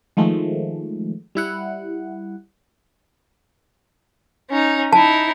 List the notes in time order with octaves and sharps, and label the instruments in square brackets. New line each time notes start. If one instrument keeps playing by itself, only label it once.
[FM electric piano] D#3 F3 G#3 A3
G3 E4 F#5
[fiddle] C#4 D#4
[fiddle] D#4 E4 [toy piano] A5